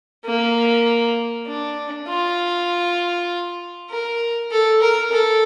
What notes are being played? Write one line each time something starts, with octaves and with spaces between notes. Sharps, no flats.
A#3
D4
F4
A#4
A4
A#4
A4